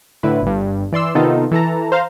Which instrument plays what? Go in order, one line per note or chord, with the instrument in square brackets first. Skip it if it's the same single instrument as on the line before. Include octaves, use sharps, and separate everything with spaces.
[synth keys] A2 D3 E4 B4
G1 G2
E3 D5 C6 E6
C3 D#3 B3 D#4 F4 A4
E3 A4 A5 A#5
C5 F5 A#5